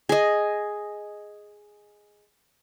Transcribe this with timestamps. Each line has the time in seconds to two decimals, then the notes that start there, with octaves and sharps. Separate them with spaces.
0.09 G#4 D#5